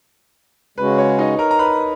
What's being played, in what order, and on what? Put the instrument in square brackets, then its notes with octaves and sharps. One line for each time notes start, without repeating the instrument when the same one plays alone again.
[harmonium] C#3 G#3 C#4 F#4 [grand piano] B4
[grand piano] C#5
D#4 D#5
A#4 A#5
A#5
B4 B5